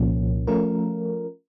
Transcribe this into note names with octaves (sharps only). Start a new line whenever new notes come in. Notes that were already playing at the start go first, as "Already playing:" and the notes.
Already playing: C2 A#2 F3 A#3 C#4
F3 A3 C#4 F4 A#4